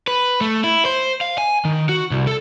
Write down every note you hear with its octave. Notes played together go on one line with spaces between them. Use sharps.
B4
A3
E4
C5
F5
G#5
D#3
F#4
C2
A4